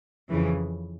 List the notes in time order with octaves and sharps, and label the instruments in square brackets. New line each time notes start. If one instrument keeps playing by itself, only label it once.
[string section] F2 C#3 E3